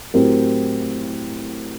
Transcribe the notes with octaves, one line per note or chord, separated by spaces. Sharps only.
A2 F#3 C4 G4 A#4